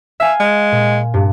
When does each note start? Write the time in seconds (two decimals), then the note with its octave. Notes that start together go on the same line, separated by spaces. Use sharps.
0.20 E5 F5 G#5
0.40 G#3
0.72 A#2
1.14 G2